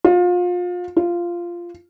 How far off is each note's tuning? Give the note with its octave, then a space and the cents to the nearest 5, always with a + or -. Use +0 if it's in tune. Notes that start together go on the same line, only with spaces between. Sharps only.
F4 +30
F4 -10